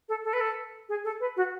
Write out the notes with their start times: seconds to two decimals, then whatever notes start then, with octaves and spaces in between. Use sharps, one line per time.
0.09 A4
0.24 A4
0.33 B4
0.41 A4
0.89 G#4
1.04 A4
1.20 B4
1.36 F#4